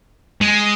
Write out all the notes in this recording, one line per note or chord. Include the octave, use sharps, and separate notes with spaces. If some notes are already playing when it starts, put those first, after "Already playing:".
G#3